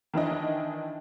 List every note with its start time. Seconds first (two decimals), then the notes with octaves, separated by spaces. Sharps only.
0.14 D#3 E3 D4 D#5